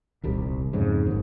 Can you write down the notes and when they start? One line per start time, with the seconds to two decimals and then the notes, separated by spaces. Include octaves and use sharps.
0.23 D#1 C2 G3
0.73 F2 G#2 C#3
1.07 G#1 D#2